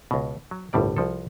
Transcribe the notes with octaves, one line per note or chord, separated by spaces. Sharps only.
C#2 B2
F#3
G1 C2 A2 G3 D5
C2 F3 A4